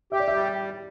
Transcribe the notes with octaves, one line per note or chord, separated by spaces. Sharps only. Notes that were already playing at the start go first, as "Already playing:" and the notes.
G4 E5
D5
E5
G3